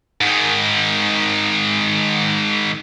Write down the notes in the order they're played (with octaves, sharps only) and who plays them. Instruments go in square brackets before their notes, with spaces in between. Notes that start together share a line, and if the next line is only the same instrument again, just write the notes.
[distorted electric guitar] G#2 D#3